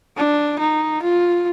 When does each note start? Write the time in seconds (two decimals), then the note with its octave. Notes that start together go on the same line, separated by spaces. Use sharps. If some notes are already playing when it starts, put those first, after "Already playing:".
0.17 D4
0.59 D#4
1.02 F4